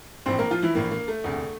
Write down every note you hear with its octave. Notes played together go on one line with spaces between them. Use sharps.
A#1 A2 E3 C4 C5
A#3 A#4
F3 F4
E3 E4
A#1 A2 E3 A#3
A#3
A3
E1 D2 C3